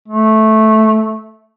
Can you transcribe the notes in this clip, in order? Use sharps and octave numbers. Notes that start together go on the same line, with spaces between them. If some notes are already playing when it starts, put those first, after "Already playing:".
A3